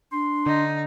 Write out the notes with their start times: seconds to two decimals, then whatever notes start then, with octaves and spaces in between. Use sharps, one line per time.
0.12 D4 C6
0.46 D3 D#4